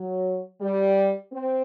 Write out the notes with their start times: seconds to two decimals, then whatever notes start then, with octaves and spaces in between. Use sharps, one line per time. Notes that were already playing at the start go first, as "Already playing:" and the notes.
Already playing: F#3
0.61 G3
1.32 C4